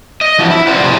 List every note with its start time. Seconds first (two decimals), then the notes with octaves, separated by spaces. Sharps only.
0.21 D#5
0.39 E3 F3 F#4
0.50 E4
0.67 C#4 F4 B4 C5 D5 F#5
0.84 F2 A2 C3 B3 G#4